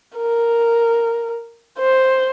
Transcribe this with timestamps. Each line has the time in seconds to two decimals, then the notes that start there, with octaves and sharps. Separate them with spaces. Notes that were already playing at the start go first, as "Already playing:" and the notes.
0.18 A#4
1.79 C5